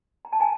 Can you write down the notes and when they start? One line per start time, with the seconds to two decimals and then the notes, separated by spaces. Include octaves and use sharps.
0.25 A#5
0.33 A5
0.40 G#5 A#5